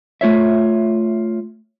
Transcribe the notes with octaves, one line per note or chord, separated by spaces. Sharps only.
A3 F4 C#5 E5